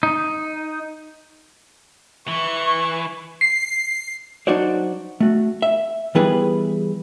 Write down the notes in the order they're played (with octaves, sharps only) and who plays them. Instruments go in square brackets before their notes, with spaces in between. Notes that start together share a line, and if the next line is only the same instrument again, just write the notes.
[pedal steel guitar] D#4
[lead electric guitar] E3 [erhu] C#6
[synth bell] C7
[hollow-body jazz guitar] F#3 D4 D#4 F#4 C5 D5
A3 F#4
E5
E3 G3 B3 E4 G#4 B4